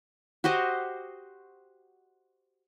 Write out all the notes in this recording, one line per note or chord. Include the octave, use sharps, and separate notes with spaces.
F#4 G4 C5 D#5